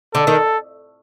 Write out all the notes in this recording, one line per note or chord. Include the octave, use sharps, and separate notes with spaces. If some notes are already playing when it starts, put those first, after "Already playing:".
D3 A4
D#3